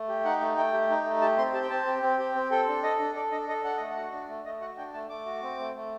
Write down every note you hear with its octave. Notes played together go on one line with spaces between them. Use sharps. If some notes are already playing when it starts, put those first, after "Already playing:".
Already playing: A3
G4
D#4 F#5
A3
A3 G5
G4
D#4
A3
G4 A5
C4 C6
G4 A5
G5
C4 A5
G4
C4
G4
C4
A4 G5
D4
A4 D#5
D4
A4 D5
D4 D#5
A4 D#5
D4 F#5
A3 D#5
F#5
F#4
D4
A3
A3 D#5
F#4 F#5
D4 G5
A3 A5
A3 D6
F#4
C4
A3
A3